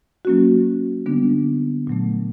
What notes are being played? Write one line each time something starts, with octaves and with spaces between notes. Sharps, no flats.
F#3 A#3 C#4 F#4
D3 G3 B3 D4
A#2 F#3 A3